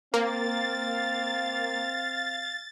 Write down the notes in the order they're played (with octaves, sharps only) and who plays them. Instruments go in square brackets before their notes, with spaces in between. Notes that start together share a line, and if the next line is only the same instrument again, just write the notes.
[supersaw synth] A#3 [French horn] C4 [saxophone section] F5 [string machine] A6